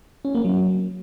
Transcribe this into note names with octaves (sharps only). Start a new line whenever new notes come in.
C#4
A#3
F#3